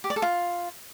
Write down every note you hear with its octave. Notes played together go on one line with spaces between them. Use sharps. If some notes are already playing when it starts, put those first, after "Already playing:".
G4
D5
A4
F4